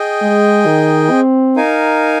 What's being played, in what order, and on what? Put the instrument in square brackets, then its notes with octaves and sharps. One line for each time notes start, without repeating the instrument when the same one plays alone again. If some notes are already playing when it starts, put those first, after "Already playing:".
Already playing: [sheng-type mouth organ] G#4 D#5 G5
[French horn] G#3
D#3
C4
[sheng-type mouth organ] D#4 A#4 F5 G#5